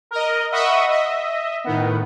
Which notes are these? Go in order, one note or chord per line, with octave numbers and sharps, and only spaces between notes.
A#4 D#5
D#5 E5 F#5 B5 C#6 D#6
D#5 E5
A2 D#3 B3